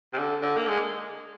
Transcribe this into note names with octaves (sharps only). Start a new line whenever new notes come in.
C3
D3
D3
A#3
G#3